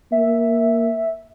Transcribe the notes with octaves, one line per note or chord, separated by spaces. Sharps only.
A#3 E5